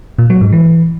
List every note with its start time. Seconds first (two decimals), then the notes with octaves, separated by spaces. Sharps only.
0.18 A#2
0.30 F#3
0.41 G#2
0.52 E3